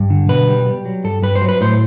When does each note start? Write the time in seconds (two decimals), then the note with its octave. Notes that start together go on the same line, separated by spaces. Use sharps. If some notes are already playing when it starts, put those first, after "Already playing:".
Already playing: G2
0.10 D3
0.29 B2 B4
0.48 G3
0.67 G3
0.85 F#3
1.04 G2 A4
1.22 G2 B4
1.35 C5
1.41 F#3
1.49 B4
1.61 A2 C5